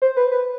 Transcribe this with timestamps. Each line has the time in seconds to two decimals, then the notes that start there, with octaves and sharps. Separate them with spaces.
0.02 C5
0.17 B4
0.32 B4